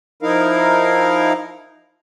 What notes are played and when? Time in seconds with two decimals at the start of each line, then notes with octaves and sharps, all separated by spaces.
0.23 F3 D#4 E4 A#4 F5